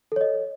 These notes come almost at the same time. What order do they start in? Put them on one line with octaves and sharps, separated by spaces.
A4 C#5 D#5